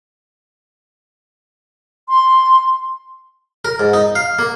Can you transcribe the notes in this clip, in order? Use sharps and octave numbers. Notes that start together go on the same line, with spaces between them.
C6
A#4
G#2
D#4
F5
A#3